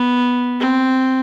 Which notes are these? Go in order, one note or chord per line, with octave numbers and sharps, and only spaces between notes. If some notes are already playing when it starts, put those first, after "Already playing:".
Already playing: B3
C4